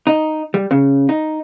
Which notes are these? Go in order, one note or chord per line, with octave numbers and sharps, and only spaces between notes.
D#4
G3
C#3
D#4